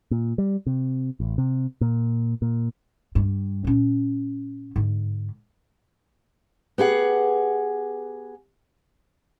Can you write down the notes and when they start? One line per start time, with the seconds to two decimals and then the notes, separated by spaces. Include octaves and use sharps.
0.11 A#2
0.38 G3
0.67 C3
1.20 A1
1.38 C3
1.81 A#2
2.42 A#2
3.15 G2
3.64 A#2 C#4
4.76 G#2 D3
6.78 B3 G4 G#4 F#5